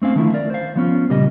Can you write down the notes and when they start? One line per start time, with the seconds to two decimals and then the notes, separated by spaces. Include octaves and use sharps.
0.02 A3 C4 C#4 F5
0.15 D3 D#3 F3 A3 E4
0.34 A#4 D5
0.50 C5 F5
0.76 F3 B3 C#4 F4
1.09 A#2 C#3 G3 A#4 D#5